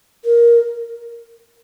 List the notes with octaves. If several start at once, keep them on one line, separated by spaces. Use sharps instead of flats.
A#4